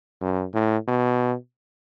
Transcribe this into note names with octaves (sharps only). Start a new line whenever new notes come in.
F#2
A2
B2